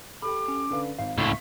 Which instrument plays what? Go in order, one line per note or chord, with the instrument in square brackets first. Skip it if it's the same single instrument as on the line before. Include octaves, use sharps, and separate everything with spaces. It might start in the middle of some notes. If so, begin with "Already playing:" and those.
[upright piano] G4 A4 [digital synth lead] B5 [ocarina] D6
[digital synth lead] C#4
[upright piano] D3 B4 F5
[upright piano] G#1 [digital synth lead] F5
[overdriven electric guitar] C#2 A2 [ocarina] C#6